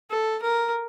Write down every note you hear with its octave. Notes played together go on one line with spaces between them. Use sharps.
A4
A#4